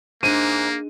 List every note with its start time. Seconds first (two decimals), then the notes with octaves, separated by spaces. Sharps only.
0.23 G#2 A#3 D4 D#7